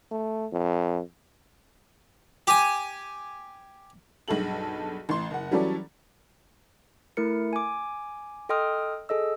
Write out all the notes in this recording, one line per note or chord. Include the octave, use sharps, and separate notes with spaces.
A3
F2
G4 G#5
B1 G2 G#4 A4 F#7
A1 C6
F#1 F#5
E3 F#3 G3 C#4 A4 D5
A3 E4 A#4 C#7
G#5 D6
A4 D#5 G5 C6 D#6 F6
G#4 A4 D#5 E6